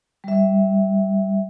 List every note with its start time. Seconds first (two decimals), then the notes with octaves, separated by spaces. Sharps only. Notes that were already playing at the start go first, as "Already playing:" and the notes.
0.24 G3 E5